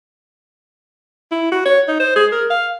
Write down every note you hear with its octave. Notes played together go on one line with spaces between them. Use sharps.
E4
F#4
C#5
D#4
C5
G#4
A#4
F5